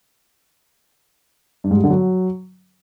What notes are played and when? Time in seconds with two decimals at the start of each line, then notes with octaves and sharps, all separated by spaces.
1.64 G2
1.71 G#2
1.77 G3
1.84 D3
1.90 F#3